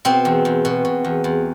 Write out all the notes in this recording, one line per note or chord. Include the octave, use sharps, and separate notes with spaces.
B2 C4
E2
E2
B2
B2
E2
E2